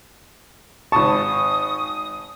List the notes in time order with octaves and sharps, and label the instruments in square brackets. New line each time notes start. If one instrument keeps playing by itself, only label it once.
[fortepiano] G#1 A5 [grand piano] C#6 [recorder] D#6